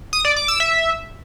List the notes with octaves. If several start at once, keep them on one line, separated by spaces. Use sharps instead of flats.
D#6
D5
D6
E6
E5